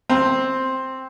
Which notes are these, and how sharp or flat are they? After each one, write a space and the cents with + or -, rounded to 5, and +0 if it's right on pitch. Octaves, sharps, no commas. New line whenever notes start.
C4 +5